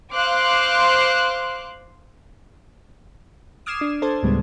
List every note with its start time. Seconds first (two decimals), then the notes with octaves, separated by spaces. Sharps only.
0.13 C5 F5 C6 D6 F#6
3.66 D6 D#6 F6 G#6 C7 E7
3.81 D4
4.02 D4 A4 C5 A5 G#6
4.23 D2 A2 C#3 G3 G#3 B3